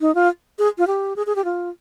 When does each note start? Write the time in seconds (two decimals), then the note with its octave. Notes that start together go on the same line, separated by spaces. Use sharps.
0.01 D#4
0.15 F4
0.59 G#4
0.78 F4
0.87 G4
1.16 G#4
1.26 G#4
1.36 G4
1.45 F4